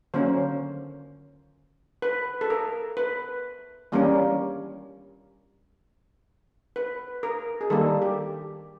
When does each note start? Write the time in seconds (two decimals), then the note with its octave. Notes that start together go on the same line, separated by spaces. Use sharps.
0.14 D3 F#3 A#3 C#4 C5
2.02 B4
2.41 A4
2.50 A#4
2.97 B4
3.92 E3 G3 A#3 C#4
6.76 B4
7.23 A#4
7.61 G#4
7.70 D#3 G3 A#3 A4
8.02 G4